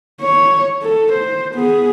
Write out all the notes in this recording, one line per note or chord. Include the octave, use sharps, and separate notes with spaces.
C#5
A4
C5
B3 G#4